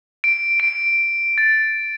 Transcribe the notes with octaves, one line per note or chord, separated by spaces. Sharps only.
D7
D7
A6